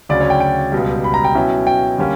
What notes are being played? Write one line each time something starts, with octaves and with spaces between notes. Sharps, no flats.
D2 C#3 F#3 D5
C#5
G5
G5
C#2 B2 G3
B5
A#5
G5
B2 F#3 C#4 E4
G5
D3 G3 A#3 C#4